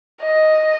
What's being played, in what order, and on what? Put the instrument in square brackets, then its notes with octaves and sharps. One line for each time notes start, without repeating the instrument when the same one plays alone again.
[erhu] D#5